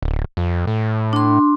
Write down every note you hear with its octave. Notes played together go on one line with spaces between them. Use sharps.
D1
F2
A2
D4 C6